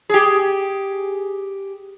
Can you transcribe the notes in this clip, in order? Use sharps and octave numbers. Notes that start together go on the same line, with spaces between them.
G4 G#4